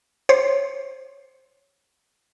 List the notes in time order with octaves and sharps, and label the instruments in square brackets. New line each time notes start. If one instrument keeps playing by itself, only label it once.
[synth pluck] C5 C#5